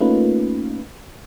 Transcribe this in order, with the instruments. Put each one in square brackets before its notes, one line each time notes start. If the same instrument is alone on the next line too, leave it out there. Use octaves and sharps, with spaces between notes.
[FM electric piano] A3 A#3 C#4 D#4 F4 B4